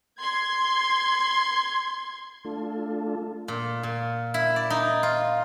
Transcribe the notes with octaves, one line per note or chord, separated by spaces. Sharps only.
C6 G#6
A3 D4 F4 A4
A#2
A#2
E4
D5
D#4
F4